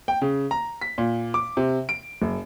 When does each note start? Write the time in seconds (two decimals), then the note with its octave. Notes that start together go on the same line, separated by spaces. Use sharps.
0.08 G5
0.21 C#3
0.51 A#5
0.81 B6
0.98 A#2
1.34 D6
1.57 C3
1.89 D7
2.22 F#1